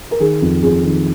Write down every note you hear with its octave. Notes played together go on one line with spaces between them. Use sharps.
A#4
D#3 G#4
F2
F2 G#4
D#3